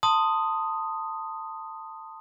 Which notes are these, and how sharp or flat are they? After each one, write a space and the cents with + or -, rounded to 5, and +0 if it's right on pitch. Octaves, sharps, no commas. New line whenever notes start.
A5 +20 C6 -10 D#6 +0